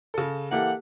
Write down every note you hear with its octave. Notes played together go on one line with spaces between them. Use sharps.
C#3 A4
E3 A#3 E4 G4 A4 F#5